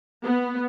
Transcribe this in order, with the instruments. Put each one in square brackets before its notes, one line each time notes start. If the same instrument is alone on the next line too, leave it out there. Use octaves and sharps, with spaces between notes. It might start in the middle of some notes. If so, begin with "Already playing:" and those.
[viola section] B3